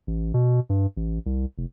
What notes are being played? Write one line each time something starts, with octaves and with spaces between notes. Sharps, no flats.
A1
B2
G2
A1
C2
F1